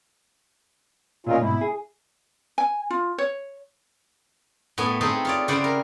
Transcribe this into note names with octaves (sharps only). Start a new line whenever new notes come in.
A#2 C#4 D#4 F4 G#4 A#4
G#2 B2 E4
G#4
G#5
F4
C#5
A2 B3 A4 G#5
C4 D#4 E4 G#4 A4 B4
F4 C#5 D5
C#3 G3 E4 C5 D5 F#5
A#4